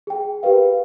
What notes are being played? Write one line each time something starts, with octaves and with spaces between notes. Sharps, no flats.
G#4 G5
G4 A#4 B4 F5